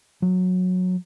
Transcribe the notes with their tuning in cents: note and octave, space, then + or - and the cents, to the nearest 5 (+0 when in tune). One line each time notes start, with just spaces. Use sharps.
F#3 -15